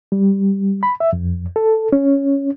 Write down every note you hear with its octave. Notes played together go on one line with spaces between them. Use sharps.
G3
B5
E5
F2
A4
C#4